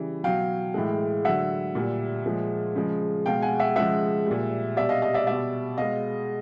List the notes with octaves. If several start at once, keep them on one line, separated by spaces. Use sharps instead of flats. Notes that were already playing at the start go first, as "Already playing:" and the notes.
Already playing: C#3 E3 G3
B2 F#3 F5 G5
A2 E3 G#3
D3 F#3 E5 F#5
A#2 G3
A#2 F3 G#3
C#3 F3 G#3
B2 G#3 F5 G5
F#5 G#5
E5 F#5
C#3 F3 G#3 E5 F#5
A#2 G3
B2 G3 D5 E5
D#5 F5
D#5 F5
D5 E5
B2 G3 D5 E5
B2 G#3 D#5 F5